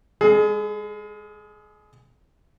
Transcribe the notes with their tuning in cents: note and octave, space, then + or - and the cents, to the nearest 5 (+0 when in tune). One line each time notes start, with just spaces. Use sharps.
G#3 -35 G#4 +30